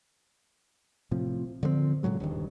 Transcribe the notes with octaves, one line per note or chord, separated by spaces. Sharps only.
A2 C3 F3
D3 F3 G3 C4
A2 C#3 F#3 G#3
D#1 G2 D#3